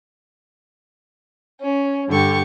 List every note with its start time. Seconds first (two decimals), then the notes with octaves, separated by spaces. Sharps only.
1.61 C#4
2.09 G2 D3 G4 C#6